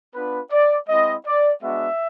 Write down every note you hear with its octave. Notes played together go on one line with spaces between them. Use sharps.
B3 D4 F4 B4
D5
G#3 C4 E4 D#5
D5
G#3 B3 D4 F#4 E5